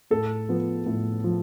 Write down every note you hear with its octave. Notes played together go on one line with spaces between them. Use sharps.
A2 A4
F3 B3
A2
F3